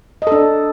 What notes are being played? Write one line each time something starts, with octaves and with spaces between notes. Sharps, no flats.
D4 A4 D#5